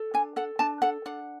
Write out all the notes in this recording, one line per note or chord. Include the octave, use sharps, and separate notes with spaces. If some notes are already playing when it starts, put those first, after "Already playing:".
Already playing: A4
D4 G#5
A4 F#5
D4 A5
A4 F#5
D4 F#5